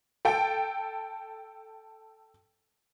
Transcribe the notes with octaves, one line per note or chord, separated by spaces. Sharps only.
A4 G5